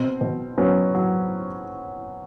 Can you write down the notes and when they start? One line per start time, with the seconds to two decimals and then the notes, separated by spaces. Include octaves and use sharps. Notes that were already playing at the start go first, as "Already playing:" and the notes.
Already playing: B2 C4
0.21 B2
0.58 F#3 B3 C#4
0.95 F#3